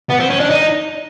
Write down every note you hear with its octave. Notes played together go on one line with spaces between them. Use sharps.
B3
C4
C#4
D4
D#4